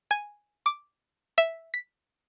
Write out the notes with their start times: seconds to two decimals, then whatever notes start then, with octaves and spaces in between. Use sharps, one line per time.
0.11 G#5
0.66 D6
1.38 E5
1.74 B6